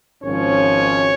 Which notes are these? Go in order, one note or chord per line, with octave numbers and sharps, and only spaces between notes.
G#1 G#2 F3 C#4 C#5